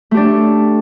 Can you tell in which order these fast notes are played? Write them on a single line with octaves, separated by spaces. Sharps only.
A3 G4 D4